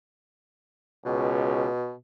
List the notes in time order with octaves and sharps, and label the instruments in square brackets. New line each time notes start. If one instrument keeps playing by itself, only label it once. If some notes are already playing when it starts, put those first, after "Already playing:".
[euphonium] C#2 [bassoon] B2